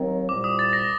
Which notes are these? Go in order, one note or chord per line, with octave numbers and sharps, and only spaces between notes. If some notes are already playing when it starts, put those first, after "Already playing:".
Already playing: D#2 D#3 F#3 C4
C2 A#2 G3 D6
D#6
A6
A#6